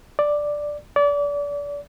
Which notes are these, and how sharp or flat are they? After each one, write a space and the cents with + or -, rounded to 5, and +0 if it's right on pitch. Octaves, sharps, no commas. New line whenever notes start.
D5 +5
D5 -30